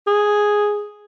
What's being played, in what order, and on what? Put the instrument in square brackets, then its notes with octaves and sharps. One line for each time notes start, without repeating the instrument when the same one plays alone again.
[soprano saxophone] G#4